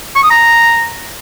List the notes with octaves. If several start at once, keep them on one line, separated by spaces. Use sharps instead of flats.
C#6
D#6
A#5